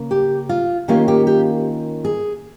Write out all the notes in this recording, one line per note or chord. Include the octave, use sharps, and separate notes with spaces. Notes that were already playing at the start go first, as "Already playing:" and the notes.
Already playing: C#3 A#3
G4
F4
D#3 A#3 C#4 F4 G4
G4
G4
G#4